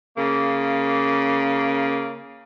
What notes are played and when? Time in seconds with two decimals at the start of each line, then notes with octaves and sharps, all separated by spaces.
0.16 C#3 A#3